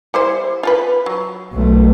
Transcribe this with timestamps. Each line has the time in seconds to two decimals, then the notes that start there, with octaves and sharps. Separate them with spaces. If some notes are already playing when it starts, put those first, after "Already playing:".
0.14 G3 E4 C5
0.63 F4 A4 B4
1.06 F#3
1.53 B1 A3